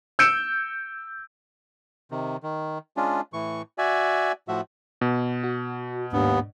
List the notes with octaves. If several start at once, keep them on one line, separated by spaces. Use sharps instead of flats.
E6 G6 C#7 D7 E7
C3 D#3
D#3
G#3 C#4 D4 F4
A2 E3 C#6
F#4 D5 E5 G#5
A2 F3 F#4 E5
B2
F#4
D#2 G#2 B3 D4